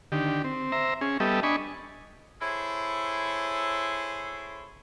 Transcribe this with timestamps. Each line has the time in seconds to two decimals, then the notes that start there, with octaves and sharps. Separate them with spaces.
0.12 D3 D#3 G4
0.44 C4
0.72 C5 E5 A#5
1.01 C#4 G#4
1.20 G3 B3 G4 A4 D#5 E5
1.43 D4 D#5 G#5 B5 C#6
2.41 E4 G#4 A4 C5 C#5